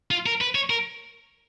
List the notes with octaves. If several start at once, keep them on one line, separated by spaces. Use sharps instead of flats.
F4
A#4
B4
C#5
A#4